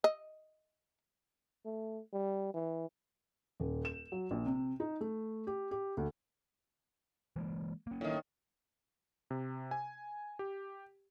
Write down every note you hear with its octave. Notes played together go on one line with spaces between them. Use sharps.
D#5
A3
G3
E3
D#1
E7
F#3
A#1
C3
D#4
A3
G4
G4
D2
E3 G#3 A#3
A#3 C#4
A2 D#3
C3
G#5
G4